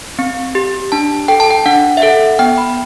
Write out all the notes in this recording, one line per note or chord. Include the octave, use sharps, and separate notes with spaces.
C4
G4
D4 A5
A4 G5
A5
G5
D4 F#5
E5
A4 F#5
B3 G5
B5